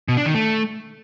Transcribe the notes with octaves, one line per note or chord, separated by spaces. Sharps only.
B2
D4
D#3
A3